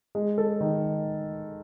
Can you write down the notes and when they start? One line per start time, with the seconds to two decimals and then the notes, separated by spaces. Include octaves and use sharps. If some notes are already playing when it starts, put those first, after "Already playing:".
0.15 G#3
0.38 A4
0.61 D#3